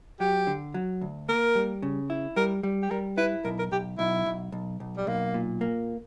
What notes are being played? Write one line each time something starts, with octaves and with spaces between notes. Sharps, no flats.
F#3 G4
D3
F#3
D2
A#3 A#4
G3
C#3
E4
G3 A#4
G3
G4
G3 A#4
E4 B4
B1 A#4
A#4
B1 G4
B1 E4
B1
B1
B1
G3
B1 A#3
A#2
A#3